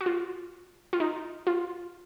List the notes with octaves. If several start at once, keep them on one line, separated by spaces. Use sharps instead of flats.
F#4
F4
F4
D#4
F4